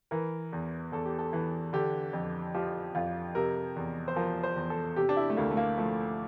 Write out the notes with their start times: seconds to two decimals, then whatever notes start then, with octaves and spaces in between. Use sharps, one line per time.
0.11 E3 A#4
0.53 E2
0.92 E2 A4
1.05 G4
1.19 A4
1.33 E3
1.73 D3 G4
2.13 F2
2.54 F3 G4
2.95 F2 F4
3.35 C3 A#4
3.76 E2
4.08 C5
4.16 F3 A#4
4.43 C5
4.56 E2
4.70 A4
4.96 C3 G4
5.09 D4
5.17 E4
5.30 A3
5.37 D2 A#3
5.51 A3
5.57 A#3
5.78 F3 A3